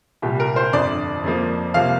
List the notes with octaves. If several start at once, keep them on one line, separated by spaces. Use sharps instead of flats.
C2 A#2 G3 G4
A#4
C5
G1 F2 D3 D5
F2 F3 A#3
C2 C3 F3 A#3 F5